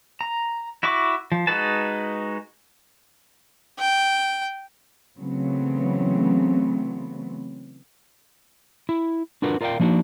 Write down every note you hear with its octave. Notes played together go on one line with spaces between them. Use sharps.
A#5
E4 F#4 E5 C#6 D6
F3
G#3 D#4 F#4 B4 A5
G5
C#3 E3 F#3 A3 B3 C4
E4
D4 F4 F#4 A#4 B4
F4 A#4 D5 D#5 F5 G5
F3 A#3 D4 D#4 F#4